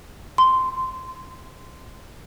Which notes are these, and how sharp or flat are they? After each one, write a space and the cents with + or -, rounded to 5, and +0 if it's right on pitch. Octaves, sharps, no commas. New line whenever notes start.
C6 -10